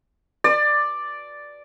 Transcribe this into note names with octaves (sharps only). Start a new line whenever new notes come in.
D5